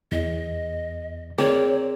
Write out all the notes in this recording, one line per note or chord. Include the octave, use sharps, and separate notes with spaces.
E2 D#5
C4 G#4 A#4 C#5 D5